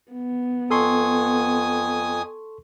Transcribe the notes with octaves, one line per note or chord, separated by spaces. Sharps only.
B3
F2 A4 G#5 C6 C#6 D#6